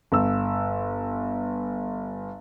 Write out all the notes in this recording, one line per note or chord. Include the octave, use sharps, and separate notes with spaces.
G1 E6